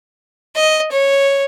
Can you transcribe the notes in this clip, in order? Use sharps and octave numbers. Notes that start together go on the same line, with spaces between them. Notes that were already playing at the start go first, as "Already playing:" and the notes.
D#5
C#5